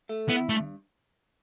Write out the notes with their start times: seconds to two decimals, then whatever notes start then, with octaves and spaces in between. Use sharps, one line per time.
0.09 A3
0.29 B3 E4
0.49 G2 A3